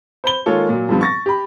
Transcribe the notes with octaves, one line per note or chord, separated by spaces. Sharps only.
C5 B5 G7
D#3 G#3 A#3 F4 A4 C#5
A#2 F#3
G2 D3 F3 G3 B3
C#6 A6 A#6
G4 B5